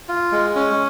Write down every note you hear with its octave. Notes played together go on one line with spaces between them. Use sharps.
F4
G#3
C#4